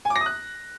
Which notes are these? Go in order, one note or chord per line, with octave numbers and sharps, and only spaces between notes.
G#5
D6
A#6
D#6
F#6